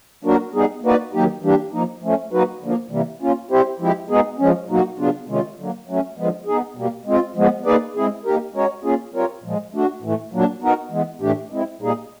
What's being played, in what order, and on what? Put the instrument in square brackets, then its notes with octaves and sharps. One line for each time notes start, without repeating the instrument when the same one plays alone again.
[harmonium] F#3 A#3 D4 F#4 A#4
G3 B3 D#4 G#4
A#3 D#4 F#4 B4 D5
D#3 F#3 A#3 D#4 G4
E3 G3 A#3 D4 G4
F3 A#3 D#4
F3 A3 C#4
F#3 A#3 D#4 F#4 B4
D3 F3 A#3
C3 E3 G3 A#3
A#3 C#4 F4
G3 C4 E4 G4 C5
F3 G#3 C4 E4 G4
B2 G#3 B3 D#4 G#4
F3 G#3 C#4
B2 F#3 A#3 D#4 F#4
C#3 F#3 B3 D4 F4
C3 D#3 G#3 C#4 F4
D3 F#3 A#3
F#3 A3 C#4
D3 F3 G#3 B3
B3 D#4 G#4
B2 G3 A#3
G#3 C4 F4
F3 G#3 B3
A#3 D#4 G#4 B4 D5
G#3 C4 E4 G#4
A#3 D#4 G4 A#4
G#3 C#4 F#4 A#4 C#5
A#3 C#4 F4 G#4
G3 C4 F4 A#4 C#5
A#2 F3 G#3
A3 D4 F#4
A2 E3 A3
A#2 F#3 A#3 D4
B3 D#4 F#4 A#4
E3 G#3 B3
A2 E3 A3 D4 G4
G#3 C4 E4
A#2 G3 A#3 D#4 G#4